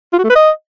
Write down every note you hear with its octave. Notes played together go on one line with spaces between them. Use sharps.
F4
F#4
A3
B4
D#5